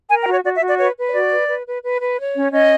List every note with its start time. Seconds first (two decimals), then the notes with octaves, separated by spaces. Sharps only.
0.09 A#4 G#5
0.22 G5
0.27 F#4 C#5
0.44 F#4 D5
0.56 E5
0.61 F#4
0.68 D5
0.79 B4 C#5
0.96 B4
1.09 C#5
1.13 F#4 D5
1.31 B4
1.48 B4
1.66 B4
1.83 B4
2.00 B4
2.18 C#5
2.35 C#4
2.51 C#4 D#5